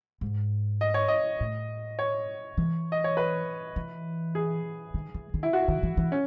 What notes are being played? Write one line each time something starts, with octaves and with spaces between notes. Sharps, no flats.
G#2
D#5
C#5
D#5
A2
C#5
E3
D#5
C#5
B4
E3
G#4
D#3
E3
D#3
E4
F#4
D#3
E3
E3
C#4